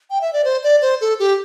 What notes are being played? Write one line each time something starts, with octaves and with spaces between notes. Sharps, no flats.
G5
E5
D5
C5
D5
C5
A4
G4